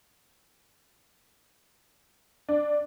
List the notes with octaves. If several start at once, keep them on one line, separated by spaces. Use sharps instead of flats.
D4